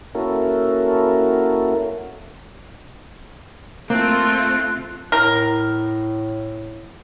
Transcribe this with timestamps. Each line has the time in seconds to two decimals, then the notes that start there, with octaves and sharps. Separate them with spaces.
0.15 A#3 C#4 E4 F#4 A4 A#4
3.90 A3 A#3 C4 F4 F#6
5.12 A2 A#4